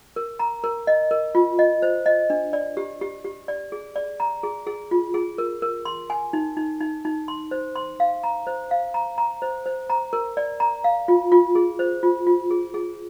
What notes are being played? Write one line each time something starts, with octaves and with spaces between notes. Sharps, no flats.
A#4
A#5
A#4
D#5
A#4
F4
D#5
C5
D#5
D4
D5
G4
G4
G4
D5
G#4
D5
A#5
G#4
G#4
F4
G#4
A#4
A#4
C6
G#5
D#4
D#4
D#4
D#4
C6
C5
C6
F5
A#5
C5
F5
A#5
A#5
C5
C5
A#5
A#4
D5
A#5
F5
F4
F4
G#4
C5
F4
F4
G#4
G#4